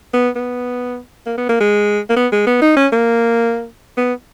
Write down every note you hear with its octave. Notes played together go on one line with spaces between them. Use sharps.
B3
B3
A#3
B3
A#3
G#3
A#3
B3
G#3
B3
D#4
C#4
A#3
B3